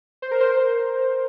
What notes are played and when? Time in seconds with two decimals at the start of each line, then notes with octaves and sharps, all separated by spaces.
0.22 C5
0.31 A#4
0.40 C5